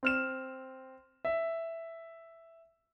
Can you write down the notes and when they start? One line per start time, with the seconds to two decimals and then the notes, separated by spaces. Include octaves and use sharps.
0.03 C4 F6 E7
1.25 E5